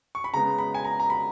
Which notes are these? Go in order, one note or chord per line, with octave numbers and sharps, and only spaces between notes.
C#6
B5
C#3 G#3 B3 A#5
B5
G#5
A#5
A#5
B5